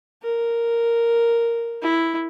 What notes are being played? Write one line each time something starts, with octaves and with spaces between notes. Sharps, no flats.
A#4
E4